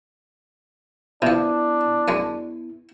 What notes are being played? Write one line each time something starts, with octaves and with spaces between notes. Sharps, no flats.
C3 F3 B3 D4 E4
F#2 G#3